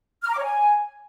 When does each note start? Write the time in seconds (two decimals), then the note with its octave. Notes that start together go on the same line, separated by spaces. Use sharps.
0.23 F6
0.28 A#5
0.33 D6
0.38 C#5
0.43 G#5